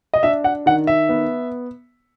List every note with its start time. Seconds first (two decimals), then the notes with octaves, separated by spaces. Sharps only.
0.14 D#5
0.23 D4 E5
0.44 F#5
0.66 D#3 F#5
0.87 E5
1.09 B3